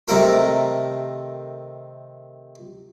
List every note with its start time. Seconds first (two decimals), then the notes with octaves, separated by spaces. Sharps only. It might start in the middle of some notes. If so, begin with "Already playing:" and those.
0.08 C3 D#3 A3 A4 A#4 B5